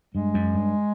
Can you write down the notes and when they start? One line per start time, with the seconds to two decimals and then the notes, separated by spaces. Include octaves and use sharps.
0.14 G2 G#3
0.34 F#2
0.54 G2